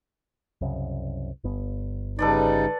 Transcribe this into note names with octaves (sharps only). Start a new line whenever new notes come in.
C2 F#2 C#3
G1 B3
C#3 G3 D#4 A4 B4 D5